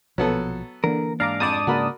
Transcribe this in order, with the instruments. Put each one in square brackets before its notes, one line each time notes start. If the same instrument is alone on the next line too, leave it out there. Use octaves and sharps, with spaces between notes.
[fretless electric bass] A#1 B2 F3 [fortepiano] F#3 B3 A4
[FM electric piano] D3 [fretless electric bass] E3 A#3 [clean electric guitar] A#4
[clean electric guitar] G#2 D4 [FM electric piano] F5 A#5 D6
[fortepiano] F2 [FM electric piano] D5 A5 D#6
[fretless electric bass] C#3 A#3 [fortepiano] F#4 A#4 B5